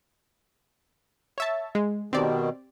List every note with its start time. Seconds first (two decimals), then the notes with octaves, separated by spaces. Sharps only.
1.38 C#5 E5 A5
1.75 G#3
2.13 B2 D#3 C4 G4 D5